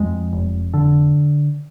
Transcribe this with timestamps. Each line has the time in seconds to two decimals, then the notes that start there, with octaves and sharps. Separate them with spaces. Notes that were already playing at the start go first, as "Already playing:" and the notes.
Already playing: F2 G#3
0.33 F1
0.74 D3